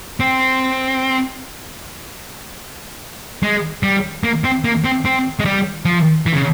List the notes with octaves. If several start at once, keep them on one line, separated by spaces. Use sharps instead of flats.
C4
G#3
G3
A#3
C4
A#3
C4
C4
G#3
G3
F3
E3
C#3